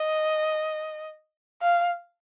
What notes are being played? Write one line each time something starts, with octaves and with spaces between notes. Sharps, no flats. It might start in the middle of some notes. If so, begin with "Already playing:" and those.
Already playing: D#5
F5